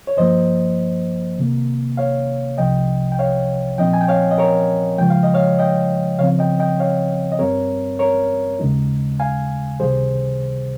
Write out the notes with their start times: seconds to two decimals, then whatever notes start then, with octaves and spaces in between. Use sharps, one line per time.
0.07 C#5
0.17 G2 F3 A#3 C5 D#5
1.38 C3 D#3 A#3
1.97 C#5 F5
2.58 C2 C3 F3 D#5 G5
3.12 G5
3.19 C#5 F5
3.78 A#2 F3 C4 D#4 D#5 G5
3.94 G#5
4.01 G5
4.08 C#5 F5
4.31 D#5
4.38 A#4 C#5
4.98 C#3 F3 G#3 G5
5.10 F5
5.23 D#5
5.34 C#5 F5
5.59 D#5 G5
6.19 C#3 F3 C4 C#5 F5
6.39 D#5 G5
6.59 D#5 G5
6.80 C#5 F5
7.32 D#5
7.39 G2 G3 C4 A#4 C#5
7.99 A#4 C#5
8.59 D#2 C#3 G#3 D#4
9.20 F5 G#5
9.80 C#2 C3 D#3 G3 G#4 C5